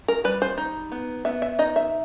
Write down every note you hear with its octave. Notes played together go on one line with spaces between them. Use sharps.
A#4
G3 B4
C5
D#4
B3
B3 E5
E5
D#4 D#5
E5